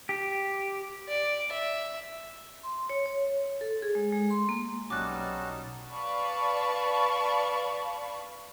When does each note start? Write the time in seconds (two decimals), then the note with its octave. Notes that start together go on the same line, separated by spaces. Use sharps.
0.09 G4
1.08 D5
1.52 E5
2.63 C6
2.90 C#5
3.06 C#5
3.61 A4
3.82 G#4
3.95 G#3
4.13 G#3
4.30 C6
4.49 A#3
4.90 B1 G3 C#4 D#4 F#4 A5 D6 F#6
5.90 B4 D5 F5 A5 B5 C#6